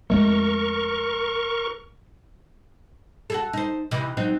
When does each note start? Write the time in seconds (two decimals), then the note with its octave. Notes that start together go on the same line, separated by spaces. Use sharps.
0.10 F2 G#3 A3 A#4 C#6
3.30 F#4 G#4 A4
3.53 D#4 C5
3.91 C3 E3 D#4
4.17 F#3 C4 D#4